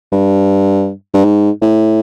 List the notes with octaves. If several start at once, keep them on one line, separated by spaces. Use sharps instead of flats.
G2
G2
G#2
A2